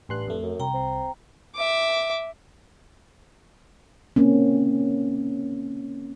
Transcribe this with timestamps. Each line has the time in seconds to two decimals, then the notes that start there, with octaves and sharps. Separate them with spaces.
0.09 A1 G2 C6 F#6
0.28 F2 A3
0.42 F#2
0.60 C2 G5 A#5
0.74 C4
1.55 E5 D6
4.16 A#3 C4 C#4